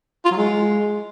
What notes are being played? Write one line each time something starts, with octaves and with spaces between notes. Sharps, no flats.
F4
F#3
G#3